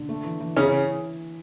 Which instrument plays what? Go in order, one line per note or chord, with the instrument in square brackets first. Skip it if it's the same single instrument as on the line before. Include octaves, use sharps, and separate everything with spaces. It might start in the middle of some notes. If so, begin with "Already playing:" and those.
Already playing: [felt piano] D3
A3
E3
E3
[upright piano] C#3 C#4 [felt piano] E4